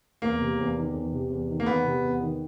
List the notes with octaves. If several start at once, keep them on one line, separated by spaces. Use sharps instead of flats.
E2 A#3
C3
E2
D#3
E2
C3
E2
D#3
A#3
E2 B3
C3
E2
D#3